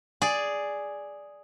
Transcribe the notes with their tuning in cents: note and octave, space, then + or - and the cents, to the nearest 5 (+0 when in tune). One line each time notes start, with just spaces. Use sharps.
G#4 +0 D5 +0